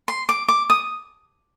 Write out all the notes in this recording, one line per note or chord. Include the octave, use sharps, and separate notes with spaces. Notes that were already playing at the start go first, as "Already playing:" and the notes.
C6
D6
D6
D#6